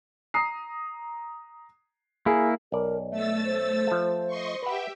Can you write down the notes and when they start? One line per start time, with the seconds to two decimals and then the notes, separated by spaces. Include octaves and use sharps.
0.34 A#5 D#6 C7
2.26 A#3 E4 G#4
2.72 B1 A#4 D5
3.11 A3 E5 E6 A6
3.46 C5
3.87 F3 A3
4.27 D#5 C6 C#6
4.63 G4 B4 E5 F#5 G5